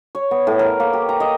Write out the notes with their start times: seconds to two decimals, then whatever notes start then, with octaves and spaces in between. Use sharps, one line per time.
0.15 C#5
0.31 B3
0.47 A2
0.59 A#4
0.80 A#3
0.93 G4
1.09 A#5
1.20 D#5